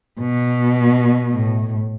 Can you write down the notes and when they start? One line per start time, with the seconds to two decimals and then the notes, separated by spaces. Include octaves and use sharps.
0.20 B2
1.33 A2